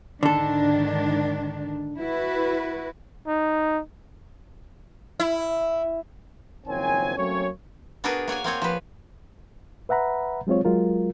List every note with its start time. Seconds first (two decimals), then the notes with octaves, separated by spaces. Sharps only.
0.23 G#2 D3 D#3 D4 A4
1.98 E4 F#4 B4
3.27 D#4
5.20 E4
6.67 F#1 D#3 F3 C4 C#5 G#5
7.17 F#3 A3 A#3 C4 C#4 C#5
8.04 B3 D4 F#4 G#4 A#4 B4
8.28 A#3 C#5 F#5 G#5
8.44 A#3 C4 G#4 C#5
8.62 F3 B4
9.89 B4 E5 F#5 A#5 B5
10.47 F#3 G#3 C4 F4 C#5
10.65 F#3 G#3 F4 A#4